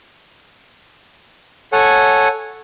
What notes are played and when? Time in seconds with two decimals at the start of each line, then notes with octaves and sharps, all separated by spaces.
1.73 A4 C#5 F#5 G#5